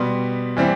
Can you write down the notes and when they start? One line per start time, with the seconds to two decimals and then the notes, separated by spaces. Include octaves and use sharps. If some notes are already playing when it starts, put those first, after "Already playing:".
Already playing: B2 G3 B3 C6
0.57 E3 G3 C4